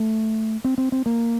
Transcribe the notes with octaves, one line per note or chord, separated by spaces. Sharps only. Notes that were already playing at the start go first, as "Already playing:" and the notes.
Already playing: A3
C4
C4
C4
A#3